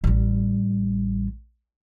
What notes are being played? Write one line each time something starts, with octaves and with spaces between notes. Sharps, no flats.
A1 G3